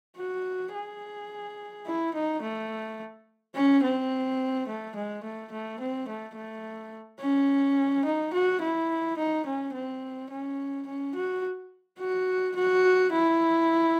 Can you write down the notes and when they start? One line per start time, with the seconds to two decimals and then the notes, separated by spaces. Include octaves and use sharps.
0.18 F#4
0.74 G#4
1.86 E4
2.14 D#4
2.43 A3
3.55 C#4
3.83 C4
4.68 A3
4.96 G#3
5.24 A3
5.52 A3
5.80 C4
6.08 A3
6.36 A3
7.21 C#4
8.05 D#4
8.34 F#4
8.61 E4
9.18 D#4
9.46 C#4
9.74 C4
10.31 C#4
10.87 C#4
11.15 F#4
11.99 F#4
12.56 F#4
13.12 E4